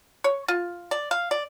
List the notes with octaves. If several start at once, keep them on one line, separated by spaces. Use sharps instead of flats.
C#5
F4
D5
F5
D5